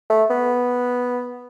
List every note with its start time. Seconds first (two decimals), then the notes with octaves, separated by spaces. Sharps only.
0.10 A3
0.30 B3